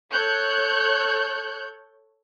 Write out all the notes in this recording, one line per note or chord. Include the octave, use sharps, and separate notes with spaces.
A4 C#5 F#6 G6